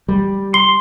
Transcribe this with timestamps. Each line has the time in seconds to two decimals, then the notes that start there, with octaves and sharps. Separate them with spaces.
0.08 G3
0.54 C6 G7